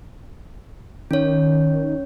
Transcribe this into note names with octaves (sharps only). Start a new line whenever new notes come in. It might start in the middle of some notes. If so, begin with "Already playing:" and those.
D#3 C#4 C#5